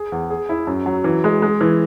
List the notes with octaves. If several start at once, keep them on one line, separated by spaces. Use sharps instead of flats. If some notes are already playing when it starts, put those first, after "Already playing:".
Already playing: G#4
E2
G#4
E4
F#2
F#3
E3
G#3
G#3
E3